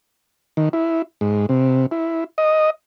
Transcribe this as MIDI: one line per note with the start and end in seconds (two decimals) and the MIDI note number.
0.57 0.69 51
0.73 1.02 64
1.21 1.46 44
1.49 1.86 48
1.91 2.24 64
2.38 2.70 75